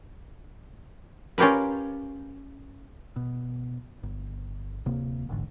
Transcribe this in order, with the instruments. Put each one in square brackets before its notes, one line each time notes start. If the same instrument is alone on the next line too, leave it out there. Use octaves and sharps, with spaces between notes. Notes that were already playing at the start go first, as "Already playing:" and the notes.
[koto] C#4 F4 G4 A#4 B4
[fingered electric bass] B2
G1
D1 C3 A#3
E1 A1 G#2 D3